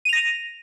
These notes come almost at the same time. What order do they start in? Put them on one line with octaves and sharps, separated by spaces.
D#7 F7 A#6